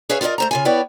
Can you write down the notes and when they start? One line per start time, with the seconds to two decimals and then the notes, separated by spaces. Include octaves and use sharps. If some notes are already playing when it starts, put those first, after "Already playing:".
0.09 G#4 B4 C#5 E5 F5 G#5
0.21 F4 A#4 B4 D5 D#5
0.38 A3 C5 A#5
0.51 C#3 F4 G#5
0.65 B3 E4 B4 C#5 D5 G5